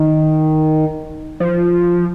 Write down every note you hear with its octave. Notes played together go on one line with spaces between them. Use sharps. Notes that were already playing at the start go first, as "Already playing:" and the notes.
Already playing: D#3
F3